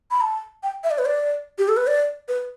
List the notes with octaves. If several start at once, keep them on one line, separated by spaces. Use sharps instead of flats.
B5
A5
G5
E5
D5
B4
D5
G4
A4
B4
D5
B4